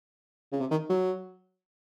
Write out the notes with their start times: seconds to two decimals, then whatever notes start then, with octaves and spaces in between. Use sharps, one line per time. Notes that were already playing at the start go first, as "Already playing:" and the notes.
0.52 C#3
0.61 C3
0.71 D#3
0.90 F#3